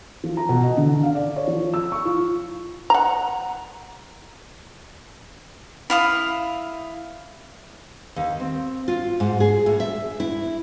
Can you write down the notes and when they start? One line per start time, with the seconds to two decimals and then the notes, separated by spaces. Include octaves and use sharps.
0.24 F3
0.37 A#5
0.49 B2
0.63 D#5
0.77 D3
1.03 F5
1.15 D5
1.36 C#5
1.47 F3
1.74 E6
1.92 C#6
2.05 F4
2.90 F#5 A#5
5.90 E4 F5 D#6
8.16 D#2
8.40 C4
8.88 F4
9.20 G#2
9.40 G#4
9.66 A2
9.80 E5
10.20 E4